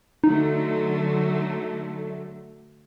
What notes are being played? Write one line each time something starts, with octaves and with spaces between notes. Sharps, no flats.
D3 F#3 A3 D#4